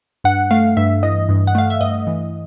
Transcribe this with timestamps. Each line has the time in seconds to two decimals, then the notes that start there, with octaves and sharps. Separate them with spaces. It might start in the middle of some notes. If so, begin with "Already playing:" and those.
0.24 G2 F#5
0.51 A3 F5
0.77 G2 E5
1.03 E3 D#5
1.29 G2
1.47 F#5
1.55 A3 F5
1.70 E5
1.81 G2 D#5
2.07 E3